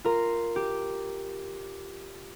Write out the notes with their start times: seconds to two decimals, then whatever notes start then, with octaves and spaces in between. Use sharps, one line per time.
0.04 F4 A#4
0.56 G4